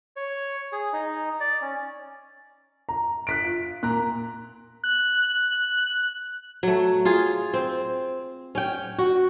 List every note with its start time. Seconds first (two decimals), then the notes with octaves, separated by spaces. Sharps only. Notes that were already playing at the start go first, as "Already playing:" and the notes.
0.16 C#5
0.72 G#4
0.93 D#4
1.40 D5
1.62 C#4
2.89 A#5
3.27 F#6 B6 D7
3.43 F4
3.83 A#2 A#5 F#6
4.84 F#6
6.63 F#3 A3
7.05 F4 G#4
7.54 C4
8.55 C#4 G5
8.99 F#4